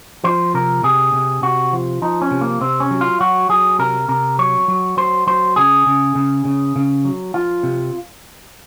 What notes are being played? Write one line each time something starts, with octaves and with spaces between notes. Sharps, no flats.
F3 C5
C3 A#4
C3 G#4
C3
C3 F#4
F3
F3 D#4
C#4
C3
A#3
C3 C4
C#4
F#3
F4
F#3 F#4
F#3 G#4
C3 A#4
C3 A#4
F#3 C#5
F#3
F#3 C5
F#3 C5
C#3 G#4
C#3
C#3
C#3
C#3
F#3
F3 F4
C3